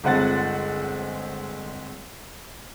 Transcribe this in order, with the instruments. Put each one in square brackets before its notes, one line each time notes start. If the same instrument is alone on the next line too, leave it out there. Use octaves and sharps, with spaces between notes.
[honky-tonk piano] G1 G#3 C4 F#5 F#6 A6